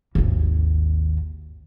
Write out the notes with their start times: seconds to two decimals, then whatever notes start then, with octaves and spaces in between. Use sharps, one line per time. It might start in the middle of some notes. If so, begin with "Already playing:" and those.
0.15 G#1 D#2